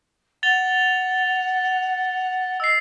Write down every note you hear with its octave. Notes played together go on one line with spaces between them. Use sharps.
F#5 A6 F7 G7
D#5 E6 C7